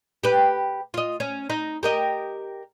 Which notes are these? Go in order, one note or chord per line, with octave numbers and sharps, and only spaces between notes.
G4 B4
F4 D#5
C#4
D#4
G4 A#4 D#5